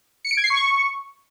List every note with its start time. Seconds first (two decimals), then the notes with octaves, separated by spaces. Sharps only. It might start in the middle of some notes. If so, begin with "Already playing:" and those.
0.25 C#7
0.31 D7
0.37 G#6
0.44 C7
0.50 C#6